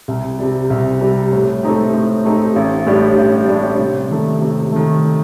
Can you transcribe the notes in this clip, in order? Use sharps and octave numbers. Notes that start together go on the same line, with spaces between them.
C2
C3 G3
C2
C3 G3
A2
A3 C4 D#4 G4
A2
A3 C4 D#4 G4
A1
A2 G3 D4 G4
A1
A2 G3 D4 G4
C3
D#3 A3
C3
D#3 A3